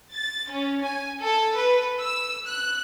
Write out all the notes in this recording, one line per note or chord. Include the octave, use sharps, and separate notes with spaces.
A6
C#4
G#5
A4
B4
E6
F#6